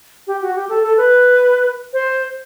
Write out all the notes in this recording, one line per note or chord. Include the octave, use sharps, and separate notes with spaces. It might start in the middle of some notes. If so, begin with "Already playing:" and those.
G4
F#4
G4
A4
A4
B4
C5